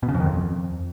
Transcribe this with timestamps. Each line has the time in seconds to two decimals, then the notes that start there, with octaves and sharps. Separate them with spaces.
0.03 B2
0.09 C#3
0.14 F2
0.20 D#3
0.26 F2